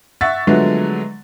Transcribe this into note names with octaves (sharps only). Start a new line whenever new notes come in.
E5 F#5 C#6 A6
D3 F3 F#3 G#3 A3 B3